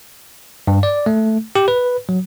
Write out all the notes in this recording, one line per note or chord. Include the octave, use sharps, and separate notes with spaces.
G2
D5
A3
G4
B4
F#3